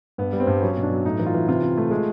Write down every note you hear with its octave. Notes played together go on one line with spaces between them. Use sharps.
G2 B3
G3
C4
G2
F#3 C#4
B2
D4
F#3
A2 D#4
E3
F4
E3
C3 F4
C3
A3
G#3